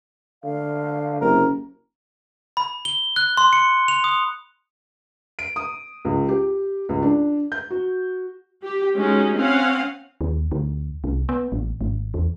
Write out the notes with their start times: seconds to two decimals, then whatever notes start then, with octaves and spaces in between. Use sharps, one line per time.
0.44 D3 F5
1.21 F#1 C3 A#4
2.57 B5
2.85 G7
3.16 F#6
3.37 C6
3.53 C#7
3.88 F7
4.04 D#6
5.39 D7
5.56 D#6
6.05 C#2
6.29 G4
6.89 C#2
7.02 D4
7.52 G6
7.71 F#4
8.63 G4
8.94 G#3 C#4 D#4 F#4
9.38 C4 C#4 F5 F#5
10.21 D#2
10.52 D2
11.04 C2
11.29 B3
11.52 A1
11.81 G#1
12.14 E2